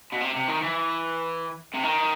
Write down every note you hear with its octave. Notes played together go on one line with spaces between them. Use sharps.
B2
C3
C3
D#3
E3
C3
D#3